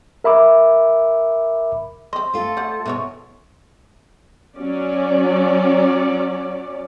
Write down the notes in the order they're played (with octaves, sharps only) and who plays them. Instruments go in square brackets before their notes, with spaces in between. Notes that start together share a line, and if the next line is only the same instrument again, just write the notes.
[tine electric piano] A#4 E5 B5 D6
[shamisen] C4 D#5 [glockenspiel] C6
[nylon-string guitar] A3 F4 [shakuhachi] A4
[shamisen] C5 D5 F#5
[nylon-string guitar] B2 [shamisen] E3 D#4 C#5
[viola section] F#3 C#4 D5